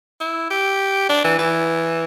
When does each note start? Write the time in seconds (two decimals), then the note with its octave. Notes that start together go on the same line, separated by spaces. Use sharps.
0.21 E4
0.50 G4
1.09 D4
1.24 E3
1.39 E3